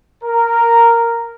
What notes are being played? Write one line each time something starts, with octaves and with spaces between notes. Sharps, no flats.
A#4